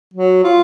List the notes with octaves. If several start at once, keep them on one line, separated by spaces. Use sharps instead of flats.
F#3
F4